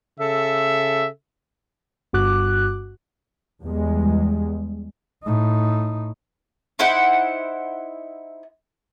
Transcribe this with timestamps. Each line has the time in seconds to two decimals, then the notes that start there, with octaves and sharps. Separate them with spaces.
0.19 C#3 A4 E5
2.13 G1 G2 F#4 D6 F#6
3.64 E2 G3 G#3
5.24 A2 D#4
6.79 D#4 E4 C5 F#5